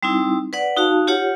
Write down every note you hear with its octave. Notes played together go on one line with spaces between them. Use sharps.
G3 C4 D#4 E4
B4 D5 F#5
D#4 F#4 F5 A5
F4 G4 C#5 F#5